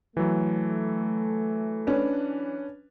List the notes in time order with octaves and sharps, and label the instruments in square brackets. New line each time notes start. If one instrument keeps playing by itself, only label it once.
[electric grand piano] E3 F#3 [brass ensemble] A3
[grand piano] C#4 D4 B4